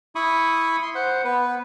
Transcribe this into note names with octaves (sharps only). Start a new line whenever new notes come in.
E4 B5 C#6 D#6
C6
C5 F#5
B3 B4